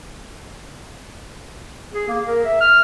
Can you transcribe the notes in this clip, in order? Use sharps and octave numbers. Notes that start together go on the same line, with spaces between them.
G#4
A#3
A#4
E5
F6